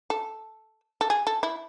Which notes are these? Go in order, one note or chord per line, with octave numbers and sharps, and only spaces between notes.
A4
A4
G#4
A4
E4